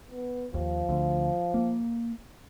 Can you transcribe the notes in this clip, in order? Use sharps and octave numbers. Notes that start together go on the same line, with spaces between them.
B3
D#2 F3
D2
A#3